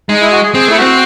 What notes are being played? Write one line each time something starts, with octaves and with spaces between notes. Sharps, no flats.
G#3 D#4
E4
F#4
G#4
C4 G#4
A3 E4
C4 F#4